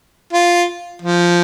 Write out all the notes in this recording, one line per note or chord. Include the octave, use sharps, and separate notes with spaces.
F4
F3